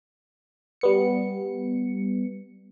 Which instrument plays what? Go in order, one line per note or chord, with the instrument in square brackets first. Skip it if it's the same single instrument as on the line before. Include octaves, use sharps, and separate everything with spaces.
[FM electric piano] G3 B3 C#7